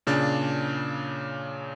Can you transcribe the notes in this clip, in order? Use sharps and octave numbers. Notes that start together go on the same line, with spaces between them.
A#2 C#3 D4 A6